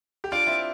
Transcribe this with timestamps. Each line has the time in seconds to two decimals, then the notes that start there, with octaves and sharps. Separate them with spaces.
0.24 G4
0.32 D4 F4 D6
0.47 C4 E4